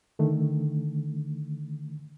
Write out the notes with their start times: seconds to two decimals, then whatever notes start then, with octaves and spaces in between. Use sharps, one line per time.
0.19 D3 D#3 A3